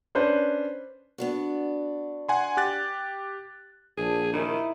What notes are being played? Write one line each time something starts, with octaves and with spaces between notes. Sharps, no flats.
C#4 D4 B4 C5
B3 D4 F#4
F#5 G#5 C6
G4 F#6 A6
A#1 G#4 A5
D#3 D#4 E4 G#5